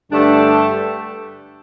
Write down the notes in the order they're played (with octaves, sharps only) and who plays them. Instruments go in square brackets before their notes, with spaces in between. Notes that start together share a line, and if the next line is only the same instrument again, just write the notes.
[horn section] G2 D3 A3 D4 G4